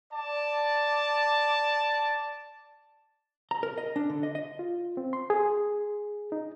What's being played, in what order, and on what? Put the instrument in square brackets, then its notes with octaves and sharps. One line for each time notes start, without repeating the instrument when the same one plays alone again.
[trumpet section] D5 A5
[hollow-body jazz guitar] A#5
A#4
D#5
D4
D3
D#5
D#5
[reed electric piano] F4
C4
C6
G#4
D#4